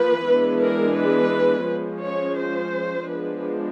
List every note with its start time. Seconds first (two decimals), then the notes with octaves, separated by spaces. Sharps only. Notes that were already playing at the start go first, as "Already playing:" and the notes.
Already playing: F3 A#3 B4
0.26 E3 G#3 B3 D4
0.61 A#4
0.96 B4
1.67 F3 G#3 C#4
2.02 C#5
2.37 C5
3.08 F3 G#3 B3 D4 B4